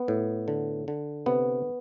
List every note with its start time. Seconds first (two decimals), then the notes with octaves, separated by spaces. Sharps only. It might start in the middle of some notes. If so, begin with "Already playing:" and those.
Already playing: B3
0.08 A2
0.48 D3
0.88 D3
1.26 C3 B3